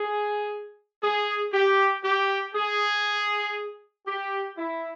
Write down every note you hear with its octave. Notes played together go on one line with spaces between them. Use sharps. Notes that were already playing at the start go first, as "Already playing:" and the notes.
Already playing: G#4
G#4
G4
G4
G#4
G4
E4